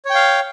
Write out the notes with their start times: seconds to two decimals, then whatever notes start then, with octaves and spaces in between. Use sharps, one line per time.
0.05 C#5
0.10 G5
0.15 F5